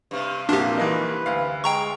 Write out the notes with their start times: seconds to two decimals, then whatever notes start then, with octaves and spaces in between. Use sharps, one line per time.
0.11 G2 C3
0.49 C2 F2 A#2 D4 F#4 G4
0.78 E3 A#3 D#4 B4
1.26 D2 F5
1.64 G#3 G5 A#5 C#6